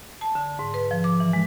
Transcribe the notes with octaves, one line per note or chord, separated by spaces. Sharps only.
A5
D3
G#2
B4
F3
D6
E3
G#3